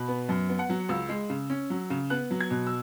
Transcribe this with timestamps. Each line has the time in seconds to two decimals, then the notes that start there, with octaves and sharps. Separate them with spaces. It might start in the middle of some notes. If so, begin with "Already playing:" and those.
Already playing: B2 B5
0.08 B3
0.29 F#2
0.49 B3
0.59 F#5
0.69 F#3
0.89 C#2 E6
1.09 G#3
1.30 C#3
1.50 C#4
1.70 F#3
1.90 C#3
2.10 B3 F#6
2.31 F#3
2.41 G#6
2.50 B2
2.66 E6